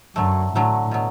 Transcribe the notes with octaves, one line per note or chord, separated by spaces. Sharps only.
F#2 D3 F#3 A3
A2 D3 F#3 A3
B2 F#3